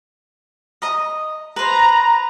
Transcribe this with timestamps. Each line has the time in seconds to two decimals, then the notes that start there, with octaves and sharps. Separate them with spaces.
0.82 D#5 A#5 D#6
1.56 B4 C5 A#5